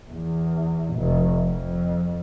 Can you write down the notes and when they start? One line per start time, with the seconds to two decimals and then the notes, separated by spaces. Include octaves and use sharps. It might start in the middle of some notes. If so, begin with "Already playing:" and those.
0.10 E2
0.95 F1
1.46 F2